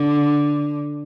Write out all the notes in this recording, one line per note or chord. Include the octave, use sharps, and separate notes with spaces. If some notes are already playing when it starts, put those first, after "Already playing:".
Already playing: D3